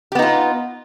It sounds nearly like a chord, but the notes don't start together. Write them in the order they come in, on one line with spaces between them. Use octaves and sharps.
G4 B3 D#4 F4